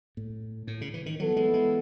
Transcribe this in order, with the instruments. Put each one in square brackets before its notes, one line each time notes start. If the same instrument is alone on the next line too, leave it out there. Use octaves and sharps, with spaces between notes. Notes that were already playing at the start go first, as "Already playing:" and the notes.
[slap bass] A2
A2
C#3
E3
D#3
[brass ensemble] E3 B3 E4 A4 [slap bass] F#3
[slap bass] G#3
G#3